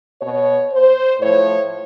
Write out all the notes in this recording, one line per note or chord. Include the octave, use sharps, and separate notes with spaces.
B2 C#5
C5
A2 F3 C#5